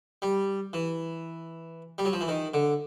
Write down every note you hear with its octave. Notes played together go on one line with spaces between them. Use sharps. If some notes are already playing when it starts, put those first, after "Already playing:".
G3
E3
G3
F#3
F3
E3
D#3
D3